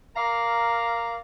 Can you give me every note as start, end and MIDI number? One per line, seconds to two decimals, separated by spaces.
0.15 1.17 70
0.15 1.17 74
0.15 1.17 77
0.15 1.17 82